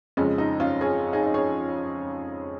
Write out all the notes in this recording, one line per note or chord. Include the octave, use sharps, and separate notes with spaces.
F2 C#3 G#3 C#4
D#4
C#4 F4
G#4 C#5
D#4 G#4
D#4
G#4 C#5